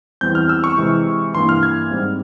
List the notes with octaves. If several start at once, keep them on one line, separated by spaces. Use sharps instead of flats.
E2 E3 G3 C4 G6
F6
E6
C#6
C3 E3 G#3
G2 E3 A#3 C6
F6
G#6
G#2 G3 C4